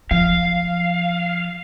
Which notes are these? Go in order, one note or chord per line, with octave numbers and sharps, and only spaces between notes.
F3 F5